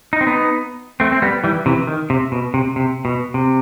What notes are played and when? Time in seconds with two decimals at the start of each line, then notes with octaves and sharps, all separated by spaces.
0.13 D#4
0.21 C4
0.27 B3 D#4
1.00 A3 C4
1.12 C4
1.22 G3 B3
1.44 E3 G3
1.66 C3 E3
1.87 D#3
2.10 C3
2.32 B2
2.54 C3
2.76 C3
3.05 B2
3.34 C3